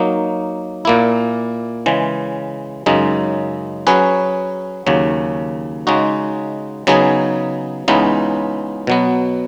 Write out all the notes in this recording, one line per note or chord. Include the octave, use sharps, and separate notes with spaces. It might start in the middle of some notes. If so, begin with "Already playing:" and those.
Already playing: F#3 A#3 D#4
A#2 A#3 E4
C#3 E3 G#3
F#2 C#3 G#3 D#4
F#3 C#4 G#4 B4
D#2 C#3 F#3
C#3 G#3 D#4 F#4
C#3 F#3 B3 D#4 G#4
C#2 C#3 E3 B3 D#4
B2 F#3 B3